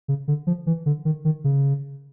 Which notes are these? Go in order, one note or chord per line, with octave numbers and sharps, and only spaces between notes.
C#3
D3
F3
E3
D3
D#3
D#3
C#3